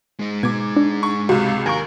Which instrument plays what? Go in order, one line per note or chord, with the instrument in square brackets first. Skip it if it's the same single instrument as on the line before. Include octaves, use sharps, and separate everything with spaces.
[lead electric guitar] G#3 D#4
[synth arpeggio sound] B2 [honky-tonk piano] D6 G#6
[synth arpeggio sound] D4
[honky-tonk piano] C#6
[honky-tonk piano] C#2 C3 [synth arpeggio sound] F#4
[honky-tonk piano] D#2 [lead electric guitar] A#4 [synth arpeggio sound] G#5 C#6